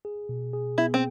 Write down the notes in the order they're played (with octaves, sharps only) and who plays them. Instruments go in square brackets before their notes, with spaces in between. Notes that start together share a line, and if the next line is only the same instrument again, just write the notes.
[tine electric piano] G#4
B2
G#4
[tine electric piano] B3 [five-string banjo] E4
[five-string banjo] C4